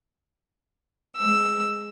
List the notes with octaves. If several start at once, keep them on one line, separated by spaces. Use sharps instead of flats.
G#3 E6